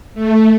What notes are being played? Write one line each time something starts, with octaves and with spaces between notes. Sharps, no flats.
A3